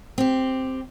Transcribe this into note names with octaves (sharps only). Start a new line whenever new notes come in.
C4 G4